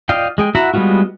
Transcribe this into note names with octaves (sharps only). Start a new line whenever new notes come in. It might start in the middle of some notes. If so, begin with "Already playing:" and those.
F4 D5 D#5 F5 G5
G#3 G#4 G5
E4 F#4 E5 F#5 A#5
G3 G#3 B3 F4 F#4